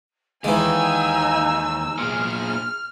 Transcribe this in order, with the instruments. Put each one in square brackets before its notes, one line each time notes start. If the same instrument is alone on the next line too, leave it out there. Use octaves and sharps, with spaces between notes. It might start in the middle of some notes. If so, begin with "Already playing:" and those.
[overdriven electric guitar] D#2 [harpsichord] E3 G#3 [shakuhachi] D#4 [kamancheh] G#5 E6
[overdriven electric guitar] A#2 G#4 [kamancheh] F6